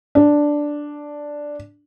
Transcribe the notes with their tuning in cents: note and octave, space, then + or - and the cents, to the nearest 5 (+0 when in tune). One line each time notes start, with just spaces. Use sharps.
D4 +0